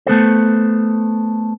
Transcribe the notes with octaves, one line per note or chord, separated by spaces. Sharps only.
A3 B3 A4 C5